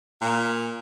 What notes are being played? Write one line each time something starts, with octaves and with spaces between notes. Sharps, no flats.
A#2